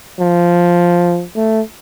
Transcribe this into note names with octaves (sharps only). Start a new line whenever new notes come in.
F3
A3